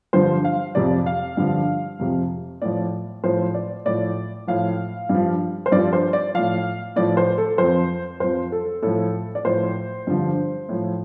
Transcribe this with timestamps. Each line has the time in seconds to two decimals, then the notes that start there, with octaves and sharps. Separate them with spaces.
0.13 G2 D3 F3 C5
0.44 F5
0.75 F2 C3 F3 D5
1.06 F5
1.37 G2 D3 F3
1.99 F2 C3 F3
2.62 A2 F3 D5
3.24 A2 F3 C5
3.54 D5
3.86 A2 F3 D5
4.47 A2 F3 F5
5.09 G2
5.15 F3
5.66 C5
5.72 G2 F3 D5
5.93 C5
6.13 D5
6.34 A2 F3 F5
6.96 A2 F3 D5
7.17 C5
7.38 A4
7.58 F2 F3 C5
8.20 F2 F3 C5
8.52 A4
8.83 A2 F3 A4
9.35 D5
9.45 A2 F3 C5
10.07 G2 D3 F3
10.69 A2 F3